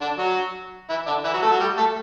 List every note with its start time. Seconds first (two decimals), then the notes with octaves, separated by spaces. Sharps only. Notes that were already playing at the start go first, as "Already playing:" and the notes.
0.01 D3 D4
0.18 F#3 F#4
0.90 E3 E4
1.06 D3 D4
1.24 E3 E4
1.34 F#3 F#4
1.42 A3 A4
1.51 F#3 F#4
1.60 G3 G4
1.77 A3 A4